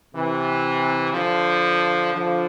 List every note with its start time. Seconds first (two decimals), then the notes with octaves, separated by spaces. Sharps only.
0.14 C3 E3
1.14 D3 F3
2.13 D3 F3